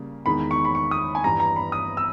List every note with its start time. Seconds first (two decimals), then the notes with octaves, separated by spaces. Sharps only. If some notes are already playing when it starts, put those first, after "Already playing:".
Already playing: C#3 G3 A#3
0.26 E2 D#3 G#3 D#4 B5
0.51 C#6
0.65 B5
0.75 C#6
0.91 D#6
1.15 G#5
1.24 G2 E3 G3 A#5
1.40 A#5
1.56 B5
1.72 D#6
1.97 E6